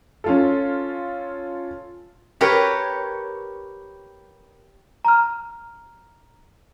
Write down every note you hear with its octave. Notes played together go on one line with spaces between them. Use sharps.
C#4 F4 A4
G4 A#4 B4 C#5
A#5 F6